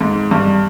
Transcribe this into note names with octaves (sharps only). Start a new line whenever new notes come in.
G#2
G2